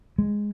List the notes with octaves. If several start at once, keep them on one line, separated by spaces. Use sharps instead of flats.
G#3